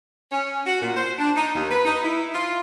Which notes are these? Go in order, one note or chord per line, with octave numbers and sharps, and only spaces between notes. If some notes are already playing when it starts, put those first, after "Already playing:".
C#4
F#4
A#2
C5
D4
D#4
D#2
B4
D#4
E4
F4